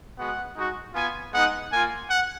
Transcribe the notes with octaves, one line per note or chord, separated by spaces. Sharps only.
G#3 B3 F#4 F#5
G#3 D#4 F#4
B3 F4 G#5
G#3 B3 D#4 F#5
A#3 F4 G#5
F#5